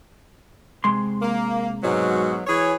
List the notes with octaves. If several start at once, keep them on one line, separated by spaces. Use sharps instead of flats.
C3 G#3 C6
A#3
G#2 B2 F#3
E3 G#4 C#5